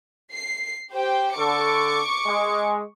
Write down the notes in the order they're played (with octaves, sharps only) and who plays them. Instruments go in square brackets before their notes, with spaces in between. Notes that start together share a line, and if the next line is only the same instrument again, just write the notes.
[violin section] C7
G4 C5 G5
[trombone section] D3 A4 [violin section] C#6 D6 C#7
[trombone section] G#3